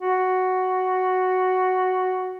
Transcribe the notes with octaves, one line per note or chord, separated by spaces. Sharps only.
F#4